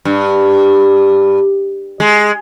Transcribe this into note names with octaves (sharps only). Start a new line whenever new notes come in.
G2
G#3